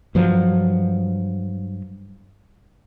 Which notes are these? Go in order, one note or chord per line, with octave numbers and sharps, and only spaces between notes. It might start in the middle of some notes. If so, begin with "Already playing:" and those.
G2 F3 F#3